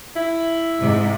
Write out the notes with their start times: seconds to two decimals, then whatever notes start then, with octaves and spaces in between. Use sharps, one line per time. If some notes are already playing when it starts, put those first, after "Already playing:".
0.16 E4
0.81 G#2 C3